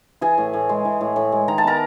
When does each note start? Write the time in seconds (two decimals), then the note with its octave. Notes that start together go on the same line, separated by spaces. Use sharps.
0.21 E3 G#4 G#5
0.38 A2
0.53 A2
0.69 G#3
0.85 E3
1.01 A2
1.16 A2
1.32 G#3
1.48 D#3 A#5
1.58 A5
1.64 B3 A#4 A#5